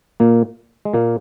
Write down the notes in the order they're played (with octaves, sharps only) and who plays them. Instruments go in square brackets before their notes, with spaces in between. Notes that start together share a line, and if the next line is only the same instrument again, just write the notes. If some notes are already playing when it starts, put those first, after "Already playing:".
[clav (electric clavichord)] A#2 A#3
G#3
A#2 A#3